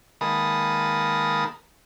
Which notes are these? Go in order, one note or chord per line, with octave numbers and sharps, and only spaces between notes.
D#3 G#3 A#3 B4 A5 D#6